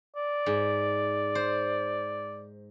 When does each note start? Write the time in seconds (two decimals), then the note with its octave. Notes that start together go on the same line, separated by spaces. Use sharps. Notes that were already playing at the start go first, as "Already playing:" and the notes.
0.16 D5
0.46 G#2
1.35 C5